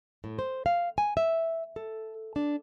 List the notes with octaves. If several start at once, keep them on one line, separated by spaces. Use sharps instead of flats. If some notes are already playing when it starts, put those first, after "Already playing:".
A2
C5
F5
G#5
E5
A4
D4